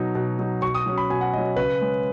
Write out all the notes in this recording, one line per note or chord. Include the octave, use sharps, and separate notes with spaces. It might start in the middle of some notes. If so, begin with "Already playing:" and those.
Already playing: B2 F#3 D#4
B2
F#3 D#4
B2 C#6
D#6
F#3 C#4
B5
B2 G#5
F#5
F#3 C#4 D#5
C#3 B4
G#3 C#4